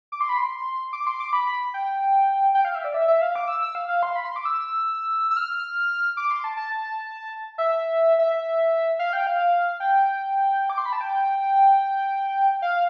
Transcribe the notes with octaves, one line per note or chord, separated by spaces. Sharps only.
D6
C6
B5
C6
D6
C6
D6
B5
B5
G5
G5
F5
E5
D5
E5
E5
F5
D6
E6
E6
F5
F5
C6
B5
C6
D6
E6
E6
F6
D6
C6
A5
A5
E5
E5
F5
G5
F5
G5
D6
C6
B5
A5
G5
F5